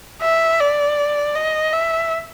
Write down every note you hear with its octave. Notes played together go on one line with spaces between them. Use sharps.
E5
D5
D#5
E5